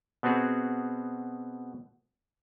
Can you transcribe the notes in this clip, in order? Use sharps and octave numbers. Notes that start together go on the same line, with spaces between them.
B2 B3 C4 F#4 G#4